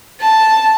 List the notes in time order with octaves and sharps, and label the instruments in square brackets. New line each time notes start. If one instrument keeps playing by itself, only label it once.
[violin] A5